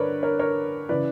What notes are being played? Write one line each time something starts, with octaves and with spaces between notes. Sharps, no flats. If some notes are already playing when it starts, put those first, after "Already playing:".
Already playing: G2 D3 A#4 B4 C#5 D5
A#4 C#5
A#4 C#5
C#3 E3 B4 D5